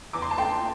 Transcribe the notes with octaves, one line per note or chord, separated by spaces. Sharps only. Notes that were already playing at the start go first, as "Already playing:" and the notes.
E2 D6
C6
A5
A3 G5 C6